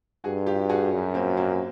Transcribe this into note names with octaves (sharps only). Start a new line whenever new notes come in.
G2 F#4 G#4
F4 G4
F#4 G#4
F#2
A#3 C4
A#3 C4